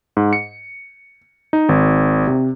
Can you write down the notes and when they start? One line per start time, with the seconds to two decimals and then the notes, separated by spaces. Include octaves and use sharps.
0.17 G#2
0.33 C#7
1.53 D#4
1.69 G#1
2.27 C3